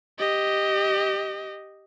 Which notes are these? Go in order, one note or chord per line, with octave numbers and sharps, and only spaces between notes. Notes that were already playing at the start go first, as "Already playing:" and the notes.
G4 D#5